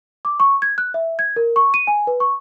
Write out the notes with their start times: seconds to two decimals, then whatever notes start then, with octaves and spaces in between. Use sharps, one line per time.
0.25 D6
0.40 C#6
0.62 G#6
0.78 F#6
0.94 E5
1.19 G#6
1.36 A#4
1.56 C#6
1.74 D#7
1.87 G#5
2.07 B4
2.20 C#6